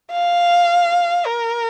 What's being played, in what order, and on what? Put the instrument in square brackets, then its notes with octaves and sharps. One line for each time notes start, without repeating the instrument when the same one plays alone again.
[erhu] F5
A#4